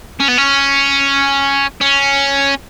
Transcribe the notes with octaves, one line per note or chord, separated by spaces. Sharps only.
C#4
B3
C#4
C#4